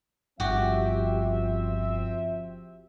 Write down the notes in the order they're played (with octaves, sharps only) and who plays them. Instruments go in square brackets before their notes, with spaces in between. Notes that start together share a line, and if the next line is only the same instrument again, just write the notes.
[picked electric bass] G1 [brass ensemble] F3 C4 E5 [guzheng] F#4 G4